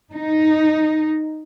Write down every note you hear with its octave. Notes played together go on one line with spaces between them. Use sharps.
D#4